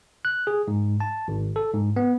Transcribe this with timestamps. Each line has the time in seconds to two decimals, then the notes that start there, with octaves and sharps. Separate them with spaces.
0.25 F#6
0.47 G#4
0.68 G#2
1.00 A5
1.28 G#1
1.56 A4
1.73 G#2
1.96 B3